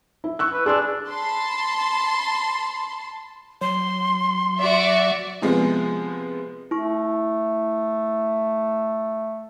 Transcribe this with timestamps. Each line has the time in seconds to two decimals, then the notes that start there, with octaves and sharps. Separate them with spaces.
0.24 E4
0.39 C#6 E6 F#6
0.53 B4
0.66 D4 G#4 C6 E6
1.09 A5 B5 C6
3.61 F#3 C6
4.58 F#4 D5 E5
5.42 C3 F3 G#3 B3
6.71 A3 E4 C#6